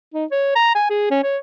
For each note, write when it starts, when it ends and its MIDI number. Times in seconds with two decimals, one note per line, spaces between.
0.14 0.25 63
0.32 0.52 73
0.55 0.72 82
0.75 0.86 80
0.90 1.08 68
1.11 1.23 61
1.23 1.37 73